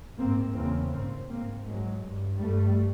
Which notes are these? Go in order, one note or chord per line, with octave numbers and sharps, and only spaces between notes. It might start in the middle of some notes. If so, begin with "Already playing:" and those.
G#2 A#3 C4
E2 C#3 A#3 C4
G#2 A#3 C4
G#2 A#3 C4
G#2 F#3 G#3
G2
G2 G3 A3